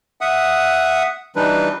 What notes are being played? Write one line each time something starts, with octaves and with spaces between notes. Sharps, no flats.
E5 F#5 D#6
E3 G3 D4 D#4 B4